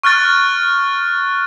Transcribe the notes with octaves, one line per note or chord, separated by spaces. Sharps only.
C#6 F6 F#6 A6